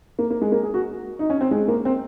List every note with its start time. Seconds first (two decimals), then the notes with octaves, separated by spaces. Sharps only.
0.19 A#3
0.30 A#3
0.41 G#3
0.52 A#3
0.63 G#4
0.74 F#4
1.19 D#4
1.30 C#4
1.41 C4
1.51 G#3
1.68 A#3
1.85 C4